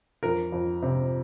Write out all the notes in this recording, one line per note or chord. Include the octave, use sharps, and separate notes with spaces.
F2 A#4
F2
C3